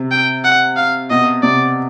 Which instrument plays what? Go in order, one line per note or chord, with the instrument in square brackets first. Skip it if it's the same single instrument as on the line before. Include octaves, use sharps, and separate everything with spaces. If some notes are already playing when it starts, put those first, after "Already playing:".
Already playing: [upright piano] C3
[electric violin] G5
F#5
F5
[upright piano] B2 [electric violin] D#5
[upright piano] C3 [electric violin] D5